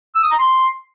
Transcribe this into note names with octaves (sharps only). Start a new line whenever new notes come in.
E6
D#6
A#5
C6